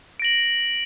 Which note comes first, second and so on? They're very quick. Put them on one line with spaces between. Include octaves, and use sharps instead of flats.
D7 A#6 F#7